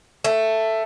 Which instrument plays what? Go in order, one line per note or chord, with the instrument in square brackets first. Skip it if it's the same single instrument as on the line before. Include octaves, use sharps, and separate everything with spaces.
[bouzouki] A3